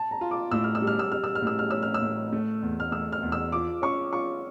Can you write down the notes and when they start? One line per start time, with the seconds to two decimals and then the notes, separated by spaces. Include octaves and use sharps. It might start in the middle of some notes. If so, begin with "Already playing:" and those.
Already playing: A5
0.11 A#5
0.21 F4
0.31 D6
0.51 A2 E6
0.64 F6
0.75 E6
0.82 G3
0.87 F6
0.99 E6
1.12 G3 F6
1.24 E6
1.35 F6
1.41 A2
1.47 E6
1.59 F6
1.71 C#4 E6
1.83 F6
1.94 E6
2.01 A2
2.33 A3
2.63 E2
2.80 F6
2.92 A3 E6
3.12 F6
3.23 E2
3.32 E6
3.52 F3 D6
3.82 C#4 C#6
4.13 F4 C#6